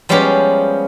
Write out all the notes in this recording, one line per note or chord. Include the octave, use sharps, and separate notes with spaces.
F3 G3 G#3 B3 C#4 G4